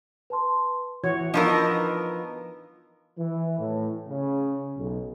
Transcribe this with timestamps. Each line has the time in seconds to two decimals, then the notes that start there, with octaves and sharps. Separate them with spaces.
0.30 B4 A5 C6
1.04 E3 F#4 C#5 G#6
1.34 F3 B3 D4 D#4 A#4 D#5 C#6 E6
3.19 E3
3.59 A2
4.08 C#3
4.77 B1